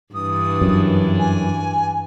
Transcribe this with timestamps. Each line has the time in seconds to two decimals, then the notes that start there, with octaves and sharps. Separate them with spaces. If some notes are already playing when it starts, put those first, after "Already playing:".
0.14 G2 E3 D4 D#6
0.61 F#2
1.19 G#5